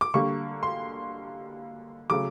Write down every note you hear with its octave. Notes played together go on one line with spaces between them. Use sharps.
D6
D3 G3 A#3 C#6
C6
C#3 F#3 A3 D6